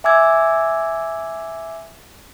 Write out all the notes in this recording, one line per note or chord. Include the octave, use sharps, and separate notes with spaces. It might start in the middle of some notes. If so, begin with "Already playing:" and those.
E5 G#5 D6 E6 G#6